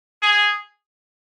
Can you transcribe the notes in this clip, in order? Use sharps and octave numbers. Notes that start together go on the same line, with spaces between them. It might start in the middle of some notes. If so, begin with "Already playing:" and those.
G#4